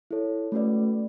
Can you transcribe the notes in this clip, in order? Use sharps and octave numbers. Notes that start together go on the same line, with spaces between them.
E4 A4 C#5
A3 C#4 F#4 B4 D5